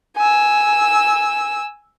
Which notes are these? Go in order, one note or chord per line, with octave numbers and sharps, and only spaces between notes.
G#5 E6